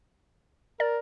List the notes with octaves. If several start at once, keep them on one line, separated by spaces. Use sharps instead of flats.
A#4 D5